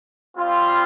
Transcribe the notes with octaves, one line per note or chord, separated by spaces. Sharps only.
G3 C4 F4